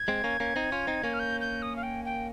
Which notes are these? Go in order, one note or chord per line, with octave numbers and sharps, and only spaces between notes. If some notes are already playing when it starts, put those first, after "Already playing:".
Already playing: G#6
G#3 C4
A#3 C#4
A#3 C#4
C4 D#4
C#4 F4
C4 D#4
A#3 C#4
F6
G6
G6
D#6
F5
G5
G5